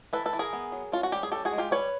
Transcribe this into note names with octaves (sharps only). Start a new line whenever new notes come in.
E3 A4 B4
A4 B4
E3
G#4 A#4
B3
F#3
C#4 F4
F#4
G3 G4
G#4
C#4 G4 A4
F#4 G#4
G#3
F4 G4
G3 B4 C#5